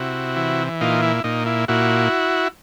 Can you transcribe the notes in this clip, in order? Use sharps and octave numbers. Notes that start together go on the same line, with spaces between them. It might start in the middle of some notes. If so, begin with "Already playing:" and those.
Already playing: C3 E4 F#4
E3
A#2 D#4 F4
E4
A#2 D#4
E4
A#2 E4 F#4